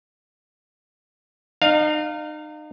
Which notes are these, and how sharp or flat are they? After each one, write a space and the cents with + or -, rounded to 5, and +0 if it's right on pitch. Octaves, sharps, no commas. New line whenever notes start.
D#4 -35 F5 +5